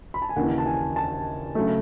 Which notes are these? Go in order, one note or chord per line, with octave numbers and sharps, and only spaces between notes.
B5
A5
G#5
D#2 C#3 E3 F#5
A5
G#5
A5
C#3 F#3 A3